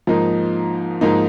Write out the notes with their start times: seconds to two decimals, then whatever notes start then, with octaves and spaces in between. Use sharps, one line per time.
0.07 G#2 F3 A#3 D#4
1.01 G#2 F3 A#3 D#4